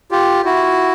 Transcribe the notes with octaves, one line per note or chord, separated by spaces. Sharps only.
F4 G4
E4 F#4